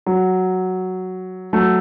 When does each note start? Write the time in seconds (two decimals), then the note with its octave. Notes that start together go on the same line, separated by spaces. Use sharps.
0.06 F#3
1.53 F#3 A3